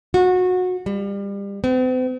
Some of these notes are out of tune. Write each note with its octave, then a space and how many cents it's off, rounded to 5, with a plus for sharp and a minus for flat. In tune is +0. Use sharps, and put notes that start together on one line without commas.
F#4 -20
G3 +30
C4 -45